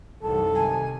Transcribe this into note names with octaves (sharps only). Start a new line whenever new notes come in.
C2 F#2 D#3 A4 A5
C3 D#3 G#5